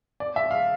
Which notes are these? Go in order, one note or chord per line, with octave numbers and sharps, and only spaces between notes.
D5
E5
F5